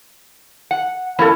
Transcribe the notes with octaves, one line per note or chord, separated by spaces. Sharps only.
F#5
F2 A#3 C#4 E4 A4